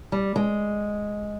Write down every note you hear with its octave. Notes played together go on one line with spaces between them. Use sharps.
G3
G#3